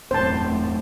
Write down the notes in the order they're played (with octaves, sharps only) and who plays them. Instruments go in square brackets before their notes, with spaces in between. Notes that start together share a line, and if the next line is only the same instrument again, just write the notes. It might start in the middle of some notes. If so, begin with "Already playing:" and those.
[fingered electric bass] E1 C4 [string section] F#2 A2 [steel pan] C5 A5